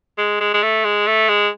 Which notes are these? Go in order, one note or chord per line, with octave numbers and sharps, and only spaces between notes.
G#3
G#3
G#3
A3
G#3
A3
G#3